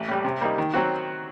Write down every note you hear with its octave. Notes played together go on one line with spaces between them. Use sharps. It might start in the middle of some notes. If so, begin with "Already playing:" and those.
Already playing: A1
A2 G3
C3
G3 A#3 D#4
D#3
F#3 C4 F#4